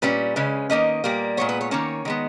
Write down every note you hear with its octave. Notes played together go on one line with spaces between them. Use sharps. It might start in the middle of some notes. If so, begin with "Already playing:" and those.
A#2 G3 C#4 B4
C#3 G#3 C#4
D#3 A#3 C#4 D#5
A#2 G3 A#3
A#2 G#3 B3 C#5
B4
C#5
D#3 A#3 C#4 C#5
D#3 G#3 B3